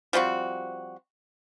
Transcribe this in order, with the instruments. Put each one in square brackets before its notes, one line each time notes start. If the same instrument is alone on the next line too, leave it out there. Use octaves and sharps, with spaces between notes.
[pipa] F3 G3 C4 F#4